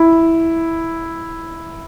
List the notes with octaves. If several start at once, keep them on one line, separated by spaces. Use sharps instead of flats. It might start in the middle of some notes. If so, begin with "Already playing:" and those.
Already playing: E4